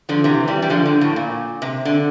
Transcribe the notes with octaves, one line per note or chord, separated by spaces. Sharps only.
D3 F3
C3 E3
E3 G3
G3
D3 F3
D3
A2
A#2
C3
D3